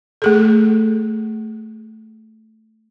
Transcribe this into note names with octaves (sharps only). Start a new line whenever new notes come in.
A3 G#4 A4